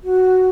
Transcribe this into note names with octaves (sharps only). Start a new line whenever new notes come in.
F#4